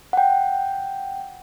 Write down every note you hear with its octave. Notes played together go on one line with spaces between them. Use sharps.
F#5 G5